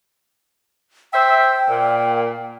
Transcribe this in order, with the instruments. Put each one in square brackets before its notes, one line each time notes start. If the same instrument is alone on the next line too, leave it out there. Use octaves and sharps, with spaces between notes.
[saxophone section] C5 E5 [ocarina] G5
[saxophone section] A#2